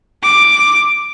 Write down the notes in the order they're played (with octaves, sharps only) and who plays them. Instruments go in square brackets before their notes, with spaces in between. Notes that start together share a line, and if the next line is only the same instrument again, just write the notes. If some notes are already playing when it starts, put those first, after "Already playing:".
[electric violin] D6